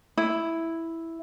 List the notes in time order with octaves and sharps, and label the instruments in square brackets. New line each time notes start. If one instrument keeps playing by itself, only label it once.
[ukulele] E4